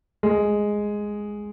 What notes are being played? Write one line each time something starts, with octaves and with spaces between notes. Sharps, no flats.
G#3